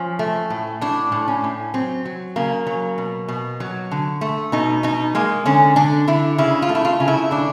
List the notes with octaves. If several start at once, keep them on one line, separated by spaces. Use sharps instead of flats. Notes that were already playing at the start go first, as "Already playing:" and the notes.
Already playing: F3 C#4
A3
A2
A2 D4
A2
C#4
A2
F#3 C4
F#3
C#3 A#3
F#3
B2
B2
F#3
D3
A3
B2 D#4
B2 D#4
G#3 A#3
D3 C#4
D3 D4
D3 E4
C#3 E4
F4
A3
E4
F4
C#3
E4
D3 D4